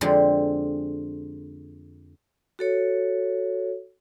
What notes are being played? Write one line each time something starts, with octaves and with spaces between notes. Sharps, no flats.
F2 D3 G#3 G4 C6
F#4 A4 C#5